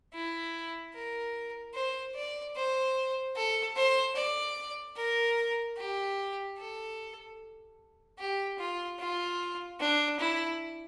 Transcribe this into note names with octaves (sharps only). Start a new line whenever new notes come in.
E4
A#4
C5
D5
C5
A4
C5
D5
A#4
G4
A4
G4
F4
F4
D4
E4